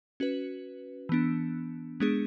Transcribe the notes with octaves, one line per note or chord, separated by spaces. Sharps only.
C#4 F#4 B4
E3 B3 D4
G#3 B3 D4 G#4